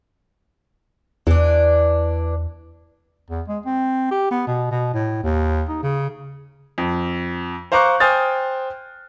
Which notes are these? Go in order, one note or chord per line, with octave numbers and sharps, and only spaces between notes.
E2 E3 D4
E2
G#3
C4
G4
B3
B2
B2
A2
D#2
D#4
C#3
F2
C5 F5 A#5 C#6 D6 F#6
C5 G5 G#5 D#6 F6 A6